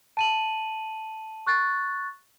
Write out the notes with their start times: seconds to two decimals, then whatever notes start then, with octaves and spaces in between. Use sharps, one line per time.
0.17 A5 D#7 F#7
1.46 C#6 F#6 A6